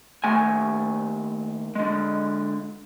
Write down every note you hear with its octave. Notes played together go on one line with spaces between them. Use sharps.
D#2 A3 G#5
D3 G#3